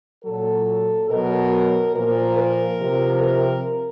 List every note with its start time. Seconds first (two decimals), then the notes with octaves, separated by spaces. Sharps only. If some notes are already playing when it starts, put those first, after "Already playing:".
0.24 A#2 F#3 A4
1.10 B2 F#3 A#4
1.95 A#2 F3 A#4
2.38 A#4
2.81 C3 F3
3.24 A#4